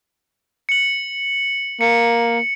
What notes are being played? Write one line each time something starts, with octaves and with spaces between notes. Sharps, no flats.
C#7 F#7
A#3 C#7